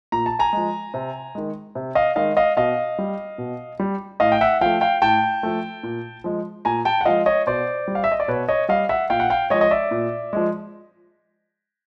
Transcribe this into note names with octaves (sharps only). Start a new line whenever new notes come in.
A#2 A#5
A5
G#5 A#5
F3 G#3
C3
D#3 G#3
C3
D#5 F5
D#3 G#3 D#5 F5
D#5 F5
B2 D#5 F5
G3
B2
G3
A2 D#5 F5
G5
E5 F#5
F3 A3 F5 G5
F5 G5
A2 G5 A5
F3 A3
A#2
F3 G#3
A#2 G#5 A#5
G5 A5
F#5
F3 G#3 D#5 F5
C#5 D#5
B2 C5 D5
G3
F5
E5
D#5
D5
B2 B4 C#5
C#5 D#5
G3 D#5 F5
E5 F#5
A#2 F5 G5
F#5
F5 G5
F3 G#3 C#5 D#5
D#5
D5 E5
A#2
F3 G#3